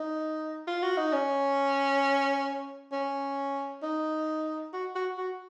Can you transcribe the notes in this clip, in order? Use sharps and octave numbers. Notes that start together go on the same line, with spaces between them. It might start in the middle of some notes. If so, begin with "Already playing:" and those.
Already playing: D#4
F4
F#4
D#4
C#4
C#4
D#4
F#4
F#4
F#4